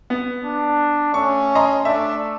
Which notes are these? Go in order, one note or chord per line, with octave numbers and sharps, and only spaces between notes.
B3
D4
A3 C#4 C#6
D#5 A#5 C6
A3 D4 E5